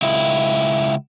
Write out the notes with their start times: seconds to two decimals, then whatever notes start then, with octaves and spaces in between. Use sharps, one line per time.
0.02 C#2 E4